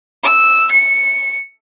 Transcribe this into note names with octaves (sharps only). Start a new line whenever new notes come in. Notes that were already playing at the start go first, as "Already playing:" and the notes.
E6
C#7